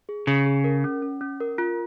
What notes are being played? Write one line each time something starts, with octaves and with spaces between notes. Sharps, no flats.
G#4
C#3 G#4
G#4
A#4
C#4
C#4
C#4
A#4
F4